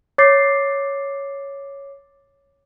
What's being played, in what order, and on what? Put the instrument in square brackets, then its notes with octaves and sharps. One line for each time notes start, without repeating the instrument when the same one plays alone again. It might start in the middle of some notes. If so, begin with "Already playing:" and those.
[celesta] C#5 D6 A6 C7